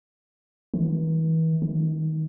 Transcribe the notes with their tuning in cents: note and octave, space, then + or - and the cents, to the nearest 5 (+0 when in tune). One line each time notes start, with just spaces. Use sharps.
E3 -40
D#3 +15